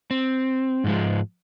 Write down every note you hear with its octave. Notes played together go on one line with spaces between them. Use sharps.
C4
G#2 F3 G#3